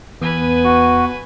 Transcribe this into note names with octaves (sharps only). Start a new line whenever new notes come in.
E2 B3 B4 G#5
F#4